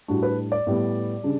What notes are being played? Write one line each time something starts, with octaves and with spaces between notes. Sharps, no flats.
A2 G3 D4 F#4
B4
D5
A2 G3 B3
C#3 G3 D4